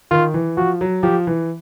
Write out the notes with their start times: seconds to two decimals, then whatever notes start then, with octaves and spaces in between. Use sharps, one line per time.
0.11 D#3 F4
0.34 E3
0.57 F3 F#4
0.81 F#3
1.03 F3 G4
1.27 E3